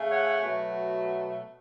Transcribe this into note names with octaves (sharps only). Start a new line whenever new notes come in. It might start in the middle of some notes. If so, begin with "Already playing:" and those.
Already playing: C#3 A3
C#5 F#5
B2 F#3 A3